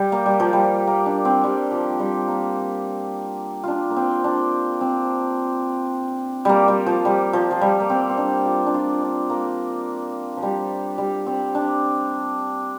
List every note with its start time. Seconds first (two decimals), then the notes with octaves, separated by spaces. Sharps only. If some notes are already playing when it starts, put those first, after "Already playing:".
Already playing: G3
0.12 A#3
0.26 G3
0.40 F3
0.53 G3
0.87 A#3
1.06 D4
1.25 C4
1.44 G3
1.71 F3
1.99 G3
2.28 A#3
3.64 D4 F4
3.90 A#3
3.96 C4
4.24 D4
4.81 C4
6.45 G3 A#3
6.68 G3
6.86 F3
7.05 G3
7.33 F3
7.51 F3
7.61 G3
7.80 A#3
7.90 C4
8.10 C4
8.17 D4
8.46 F4
8.66 D4
8.74 F4
9.02 D4
9.30 A#3
10.37 F3
10.43 G3
10.98 G3
11.26 C4
11.55 D4